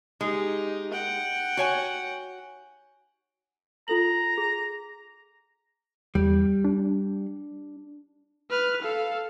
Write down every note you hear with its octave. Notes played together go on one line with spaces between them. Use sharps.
G#3 D#4 G4
F#5 G5
F#4 C#5 G#5
F4 A4 A#5 F#7
G#4
E2 G3
D4
B4 F6
A4 F5